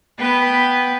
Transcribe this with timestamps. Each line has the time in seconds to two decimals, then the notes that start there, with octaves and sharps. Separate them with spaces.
0.18 B3 B4 G5